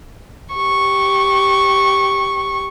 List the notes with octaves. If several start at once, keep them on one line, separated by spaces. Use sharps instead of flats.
G4 C#6